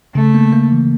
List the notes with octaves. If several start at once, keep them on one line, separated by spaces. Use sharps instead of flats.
C#3 A3
A#3
A#3
E3